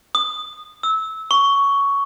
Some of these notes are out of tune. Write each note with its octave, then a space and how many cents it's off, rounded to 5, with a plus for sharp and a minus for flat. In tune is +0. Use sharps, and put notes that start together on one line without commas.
D#6 -20
E6 -20
C#6 +10